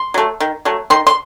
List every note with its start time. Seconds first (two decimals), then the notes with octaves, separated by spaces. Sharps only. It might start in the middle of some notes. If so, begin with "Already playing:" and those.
Already playing: C6
0.14 F#3 A3
0.40 D#3
0.65 F#3 A3
0.90 D#3 C6
1.07 C6